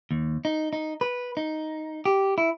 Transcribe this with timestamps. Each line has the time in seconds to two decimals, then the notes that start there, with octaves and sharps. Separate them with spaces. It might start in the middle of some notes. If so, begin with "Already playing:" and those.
0.11 D#2
0.45 D#4
0.73 D#4
1.01 B4
1.37 D#4
2.06 G4
2.38 E4